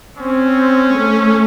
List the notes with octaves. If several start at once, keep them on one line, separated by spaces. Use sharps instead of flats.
C4 C#4
A3